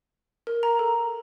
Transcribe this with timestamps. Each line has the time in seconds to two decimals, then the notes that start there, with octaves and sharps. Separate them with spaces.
0.47 A#4
0.63 A#5
0.79 A4